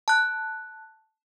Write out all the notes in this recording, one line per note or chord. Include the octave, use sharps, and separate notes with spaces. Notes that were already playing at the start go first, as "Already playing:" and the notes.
A5 F#6